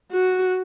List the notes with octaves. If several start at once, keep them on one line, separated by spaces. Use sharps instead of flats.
F#4